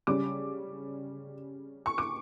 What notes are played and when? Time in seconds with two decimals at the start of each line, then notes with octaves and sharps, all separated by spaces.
0.07 C#3 G3 C#4 D6
1.86 C#6
1.98 D6